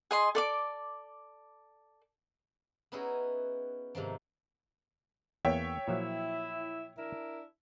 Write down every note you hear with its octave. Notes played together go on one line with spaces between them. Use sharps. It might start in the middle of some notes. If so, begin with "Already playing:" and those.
G#4 D#5 C6
A4 D5 D6
B3 C#4 D#4 E4 F#4 G#4
G#2 C3 D#3 F3
E2 A#3 B3 C#5 E5 G5
A#2 F3 F#3 E4
D4 E4 A#4